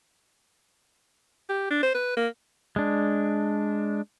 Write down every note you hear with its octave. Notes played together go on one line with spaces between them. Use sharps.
G4
D4
C5
B4
A#3
G#3 D4